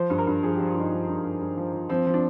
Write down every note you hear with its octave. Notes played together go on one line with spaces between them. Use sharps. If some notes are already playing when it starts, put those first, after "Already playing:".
Already playing: F3 C5
G2
A#4
G2
F3 G#4
F3 G4
F4
G2 D#4
F3 D4
G2
G2
G2
F3
F3
F3 C4
F3
D4